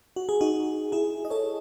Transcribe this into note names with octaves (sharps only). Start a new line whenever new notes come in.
F#4
G#4
D#4 F#4
E4 G#4
D#5
A4 C#5